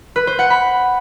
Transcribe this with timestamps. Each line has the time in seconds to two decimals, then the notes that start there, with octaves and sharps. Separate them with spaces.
0.16 B4
0.27 C5
0.39 F#5
0.50 B5